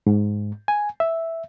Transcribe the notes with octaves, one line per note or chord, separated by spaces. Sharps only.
G#2
G#5
E5